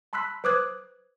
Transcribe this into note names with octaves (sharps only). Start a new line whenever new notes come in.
A5 B5 C6 E6 F#6 B6
B4 C5 D6 D#6 F#6 G#6